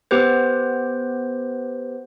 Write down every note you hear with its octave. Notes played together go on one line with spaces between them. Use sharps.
B3 G4 B4 C5